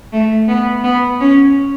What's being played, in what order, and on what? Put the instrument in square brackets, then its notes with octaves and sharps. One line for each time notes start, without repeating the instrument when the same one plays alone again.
[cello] A3
B3
B3
C#4